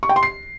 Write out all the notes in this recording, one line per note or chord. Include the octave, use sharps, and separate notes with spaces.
C#6
G5
C6
C7